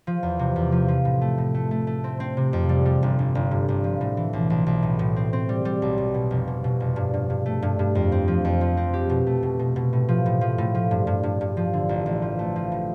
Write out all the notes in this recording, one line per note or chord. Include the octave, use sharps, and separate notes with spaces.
F3
E2
C3
E2
F3
F3
A2
A3
A2
A3
A3
A3
C4
C4
C3
F2
G3
G3
G1
G1
G1
G2
G1
F3
A2
E3
B1
B1
B1
A2
A2
C4
C4
G3
G3
B1
B2
B2
F1
B2
B2
F1
G2
G2
G2
A3
G2
G2
F2
C4
F3
F2
F3
C4
G4
B2
A3
B2
B2
B2
A2
F3
A2
F3
A2
F3
G2
G2
G2
G2
F3
D3
A1
A1
F3
A3
F3
A2